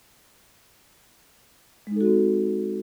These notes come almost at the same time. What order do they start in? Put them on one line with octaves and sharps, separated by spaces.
G#3 D#4 A4 F#4 C4